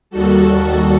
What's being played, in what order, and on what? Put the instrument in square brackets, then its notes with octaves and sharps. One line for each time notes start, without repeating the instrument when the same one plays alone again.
[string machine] D#2 D#3 G3 F#4 A4